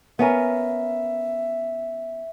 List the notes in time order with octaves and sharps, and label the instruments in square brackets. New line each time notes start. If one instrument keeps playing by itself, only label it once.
[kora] B3 C#4 A#4 [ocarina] E5